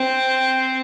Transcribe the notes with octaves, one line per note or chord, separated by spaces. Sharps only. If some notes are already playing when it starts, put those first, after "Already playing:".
Already playing: C4